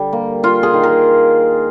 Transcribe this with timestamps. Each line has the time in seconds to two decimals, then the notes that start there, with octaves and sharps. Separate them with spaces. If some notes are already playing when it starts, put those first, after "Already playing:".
Already playing: D3 G3
0.13 A#3
0.43 A#3 F4
0.63 G#4
0.74 D#3
0.83 A#4